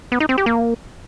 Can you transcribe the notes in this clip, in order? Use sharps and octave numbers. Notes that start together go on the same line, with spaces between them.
B3
D#4
C4
G4
A#3